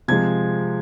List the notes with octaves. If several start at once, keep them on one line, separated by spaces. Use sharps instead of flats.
C3 F3 G#3 G#6